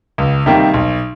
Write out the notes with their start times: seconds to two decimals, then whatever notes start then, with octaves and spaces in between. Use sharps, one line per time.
0.18 C#2
0.46 C3 D#3 G3 A#3
0.74 B1